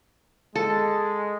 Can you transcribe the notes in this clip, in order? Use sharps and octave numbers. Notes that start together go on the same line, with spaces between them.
G#3 A4